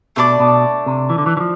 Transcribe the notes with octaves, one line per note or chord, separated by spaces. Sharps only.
B2 A3 D4 A4 D5
B2
C3
E3
D3
E3
E3
F3